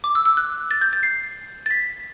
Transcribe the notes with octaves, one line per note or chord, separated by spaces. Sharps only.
D6
E6
E6
F#6
A6
G6
A6
C7
A6
B6